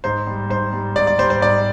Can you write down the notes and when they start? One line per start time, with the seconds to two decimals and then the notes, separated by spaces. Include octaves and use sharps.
0.04 G#2 C5
0.27 G3
0.50 G#2 C5
0.73 G3
0.96 G#2 D5
1.07 D5
1.18 G3 C5
1.30 C5
1.41 G#2 D5